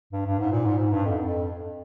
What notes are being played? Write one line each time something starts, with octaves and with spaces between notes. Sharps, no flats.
G2
G2
G#2
A#2
G#2
G#2
G2
F2
F2